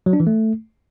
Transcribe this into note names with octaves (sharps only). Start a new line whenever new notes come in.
F#3
D4
E3
A3